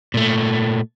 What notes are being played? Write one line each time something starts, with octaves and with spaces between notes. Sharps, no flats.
A#2 A3